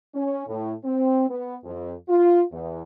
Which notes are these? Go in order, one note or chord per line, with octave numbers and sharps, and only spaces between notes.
C#4
A2
C4
B3
F2
F4
E2